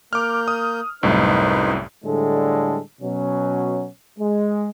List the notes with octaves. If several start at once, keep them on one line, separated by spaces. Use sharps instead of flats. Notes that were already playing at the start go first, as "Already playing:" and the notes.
A#3 D6 F6 G6
D#6
C2 F#2 A2 D#4 B4 C5
A2 D3 G3 G#3 D4 A4
B2 F#3 C#4
G#3